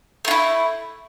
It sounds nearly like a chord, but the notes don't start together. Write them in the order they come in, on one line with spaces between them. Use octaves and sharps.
A3 F4 E4